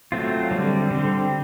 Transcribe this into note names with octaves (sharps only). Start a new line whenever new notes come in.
F#3 A3 C4 F4
D3 G3 C4
D3 G3 C4